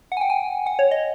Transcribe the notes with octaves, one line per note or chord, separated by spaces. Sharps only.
F#5
G#5
G5
G#5
F#5
C#5
D#5